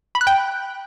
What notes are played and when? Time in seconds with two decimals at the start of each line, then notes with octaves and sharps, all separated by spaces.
0.15 B5
0.21 F#6
0.27 G5